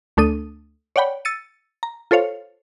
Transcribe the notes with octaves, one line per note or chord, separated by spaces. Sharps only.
D2 A3 D4 A4 D#6 D#7
C#5 D5 F#5 G5 B5
E6 A6 C#7 D#7
A#5
F4 A4 C5 C#5 F5